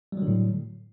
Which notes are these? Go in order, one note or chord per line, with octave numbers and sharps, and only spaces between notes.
A2 D3 F#3 G3